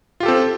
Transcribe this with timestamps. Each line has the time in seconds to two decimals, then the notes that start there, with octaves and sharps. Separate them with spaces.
0.20 F4
0.23 G4
0.26 A4
0.28 C4